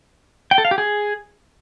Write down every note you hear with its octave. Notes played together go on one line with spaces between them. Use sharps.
G5
A4
F5
G4
G#4